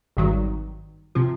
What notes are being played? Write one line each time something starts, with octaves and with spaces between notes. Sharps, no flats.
G#1 G2 D#3 F#3
C3 F3